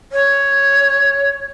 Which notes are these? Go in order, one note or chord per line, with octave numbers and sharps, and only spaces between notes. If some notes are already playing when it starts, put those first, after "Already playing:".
C#5